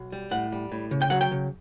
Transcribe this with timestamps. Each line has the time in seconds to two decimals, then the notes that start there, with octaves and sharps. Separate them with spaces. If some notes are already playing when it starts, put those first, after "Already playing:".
Already playing: B1
0.12 G3
0.31 A2 F#5
0.52 G3
0.72 A2
0.91 C#3
1.02 G5
1.10 F#3 F#5
1.21 G5
1.31 C#3